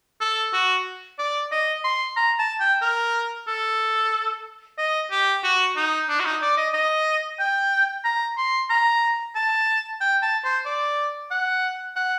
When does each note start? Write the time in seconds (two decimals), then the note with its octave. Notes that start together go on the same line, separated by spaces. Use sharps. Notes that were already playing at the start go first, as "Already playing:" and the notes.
0.21 A4
0.54 F#4
1.19 D5
1.52 D#5
1.84 C6
2.16 A#5
2.39 A5
2.60 G5
2.82 A#4
3.48 A4
4.78 D#5
5.11 G4
5.44 F#4
5.76 D#4
6.09 D4
6.20 F#4
6.25 D#4
6.42 D5
6.58 D#5
6.74 D#5
7.40 G5
8.05 A#5
8.38 C6
8.70 A#5
9.35 A5
10.01 G5
10.22 A5
10.44 C5
10.66 D5
11.31 F#5
11.96 F#5